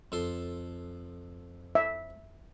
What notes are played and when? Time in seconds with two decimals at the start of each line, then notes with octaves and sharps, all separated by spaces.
0.12 F2 A4 C6
1.75 E5